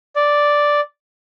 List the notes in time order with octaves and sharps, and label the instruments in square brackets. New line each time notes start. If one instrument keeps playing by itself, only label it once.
[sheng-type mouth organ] D5